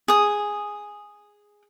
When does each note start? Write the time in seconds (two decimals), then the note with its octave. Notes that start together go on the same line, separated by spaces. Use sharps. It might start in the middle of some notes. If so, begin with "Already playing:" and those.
0.08 G#4 D#6